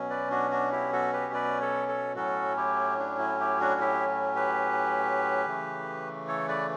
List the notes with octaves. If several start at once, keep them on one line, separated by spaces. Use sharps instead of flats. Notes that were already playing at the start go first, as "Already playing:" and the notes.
Already playing: B2 F#3 C#4
B4 D5
D4 F#4
D4 F#4
E4 G4
F#4 A4
G4 B4
B4 D5
A4 C#5
A4 C#5
A2 F#3 C#4 F#4 A4
E4 G4
D4
E4
E4 G4
D4 F#4
E4 G4
G4 B4
C#3 E3 A3
A4 C#5
B4 D5